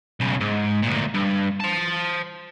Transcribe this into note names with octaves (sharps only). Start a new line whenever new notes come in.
B1 C#3
G#2
D2 A#2
G2
C5 A5